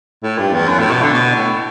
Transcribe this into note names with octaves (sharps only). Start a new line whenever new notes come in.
A2
G2
E2
F#2
A2
B2
D3
B2
A2